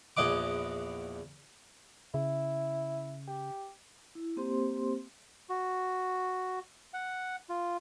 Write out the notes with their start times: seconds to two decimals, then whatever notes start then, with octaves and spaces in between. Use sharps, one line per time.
0.17 A#1 E2 D#5 F#5 D6
2.14 C#3 E4
3.28 G4
4.15 E4
4.37 A#3 C4 G4 C5 C6
5.49 F#4
6.94 F#5
7.49 F4